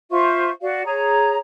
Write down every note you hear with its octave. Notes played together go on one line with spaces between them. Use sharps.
F4 C5 E5 C#6
F#4 D5 F5
G#4 C#5 A#5